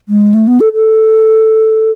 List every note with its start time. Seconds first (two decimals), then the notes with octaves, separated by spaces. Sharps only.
0.09 G#3
0.34 A3
0.47 B3
0.60 A4
0.73 A4